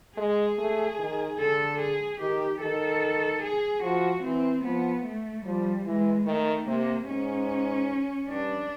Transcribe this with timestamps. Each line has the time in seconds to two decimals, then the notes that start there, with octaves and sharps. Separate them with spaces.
0.17 G#3 G#4
0.59 A3
0.99 D#3
1.39 D3 A4
1.80 G#4
2.20 D#3 G4
2.61 D#3 A4
3.42 G#4
3.83 F3 F#4
4.23 E3 C4
4.64 F3 B3
5.04 A3
5.45 F3 G3
5.85 E3 G#3
6.26 D#3 A3
6.67 C3 A#3
7.08 G#2 C#4
8.29 G2 D4